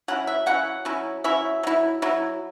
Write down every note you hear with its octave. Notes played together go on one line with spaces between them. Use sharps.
F#3 C#4 E4 F#5
E5
F#3 C#4 E4 F#5
F#3 C#4 E4
F#3 C#4 E4 E5
F#3 E4
F#3 E4